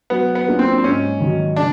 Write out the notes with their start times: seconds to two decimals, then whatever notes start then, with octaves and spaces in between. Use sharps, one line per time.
0.10 F#3 B3
0.35 B3
0.47 A#3 D4 F4 G#4
0.59 C4
0.78 C4
0.84 G#2 C#4
1.20 D#3 F#3
1.56 C#3 D4